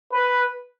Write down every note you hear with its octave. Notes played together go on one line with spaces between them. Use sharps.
B4